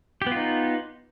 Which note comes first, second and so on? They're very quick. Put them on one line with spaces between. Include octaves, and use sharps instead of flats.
G4 B3 F4 D#4